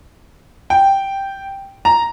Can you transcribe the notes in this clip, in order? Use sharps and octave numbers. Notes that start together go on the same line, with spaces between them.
G5
A#5